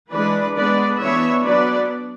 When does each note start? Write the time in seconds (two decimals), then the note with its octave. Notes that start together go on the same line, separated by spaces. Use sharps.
0.12 E3 G#3 D4 B4 D5
0.56 G#3 B3 D4 B4 D5
1.00 E3 B3 D4 C#5 E5
1.44 F#3 B3 D4 B4 D5